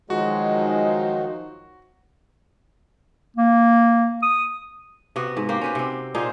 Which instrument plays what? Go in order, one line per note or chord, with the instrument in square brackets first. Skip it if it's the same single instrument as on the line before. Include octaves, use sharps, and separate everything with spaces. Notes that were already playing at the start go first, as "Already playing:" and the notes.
[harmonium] D#3 F#3 [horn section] F3 D#4 C5 [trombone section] G#3 [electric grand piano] F#4
[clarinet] A#3
D#6
[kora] C3 B3 F#4
G#2
A#3 F#4 G4 C5
C#4 B4 C5
C3 C4
A#2 D#4 G#4 C5